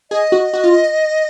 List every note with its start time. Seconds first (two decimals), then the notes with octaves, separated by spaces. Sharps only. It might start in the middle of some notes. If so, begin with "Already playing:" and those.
0.11 G#4 D#5
0.32 F#4
0.53 F#4
0.64 F4